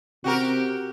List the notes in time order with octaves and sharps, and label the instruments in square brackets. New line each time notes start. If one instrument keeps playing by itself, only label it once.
[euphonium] C3 [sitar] F#4 G4 A#4